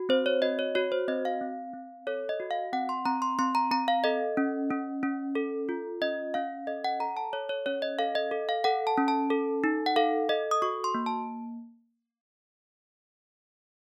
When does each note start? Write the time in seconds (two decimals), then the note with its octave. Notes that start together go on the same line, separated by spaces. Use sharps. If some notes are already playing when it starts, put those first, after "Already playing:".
Already playing: F#4
0.09 C4 C5
0.26 C#5
0.42 F#4 D#5
0.59 C#5
0.75 F#4 C#5
0.92 C5
1.08 C4 D#5
1.25 F5
1.41 C4
1.74 C4
2.07 A4 C#5
2.29 D#5
2.40 F#4
2.51 F5
2.73 C4 F#5
2.89 C6
3.05 C4 A#5
3.22 C6
3.39 C4 C6
3.55 A#5
3.71 C4 A#5
3.88 F5
4.04 A4 D#5
4.37 C#4
4.71 C#4
5.03 C#4
5.35 A4
5.69 F4
6.01 C#4 D#5
6.34 C#4 F5
6.67 A4 D#5
6.84 F#5
7.00 A4 A#5
7.17 A5
7.33 A4 C#5
7.49 C#5
7.66 C#4 C#5
7.82 D#5
7.99 A4 F5
8.15 D#5
8.31 A4
8.49 F5
8.64 A4 F#5
8.87 A5
8.98 C#4
9.08 A5
9.30 A4
9.64 D#4
9.86 F#5
9.96 A4 F5
10.29 A4 D#5
10.51 D#6
10.62 F#4 C#6
10.84 C6
10.94 A#3
11.06 A5